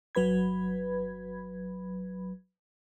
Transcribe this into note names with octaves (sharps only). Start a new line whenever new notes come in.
G1 F#3 B4 B5 G#6